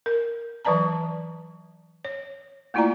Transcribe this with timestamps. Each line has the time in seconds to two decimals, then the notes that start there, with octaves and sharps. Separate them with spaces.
0.06 A#4
0.65 E3 F#3 B4 D5 A5 A#5
2.05 C#5
2.74 A3 A#3 E4 F4 D5 A#5